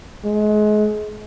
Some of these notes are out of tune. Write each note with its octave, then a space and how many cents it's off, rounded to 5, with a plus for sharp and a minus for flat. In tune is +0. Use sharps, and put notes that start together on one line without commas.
G#3 +30